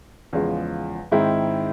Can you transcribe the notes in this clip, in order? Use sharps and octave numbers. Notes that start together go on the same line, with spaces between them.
E2 C#3 F3 G#3
G#2 D#3 G#3 C4 E4